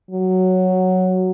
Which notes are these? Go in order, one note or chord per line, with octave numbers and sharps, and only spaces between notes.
F#3